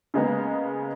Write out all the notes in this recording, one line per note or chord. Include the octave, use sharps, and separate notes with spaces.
C#3 G#3 A#3 B3